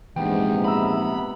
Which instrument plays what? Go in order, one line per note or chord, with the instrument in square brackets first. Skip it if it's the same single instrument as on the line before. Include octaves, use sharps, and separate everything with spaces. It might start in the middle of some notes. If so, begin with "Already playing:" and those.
[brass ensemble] A#1 G#2 [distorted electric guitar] E2 [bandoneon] C3 B3 [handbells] G5
[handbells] E5 A#5 E6 [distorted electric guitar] B5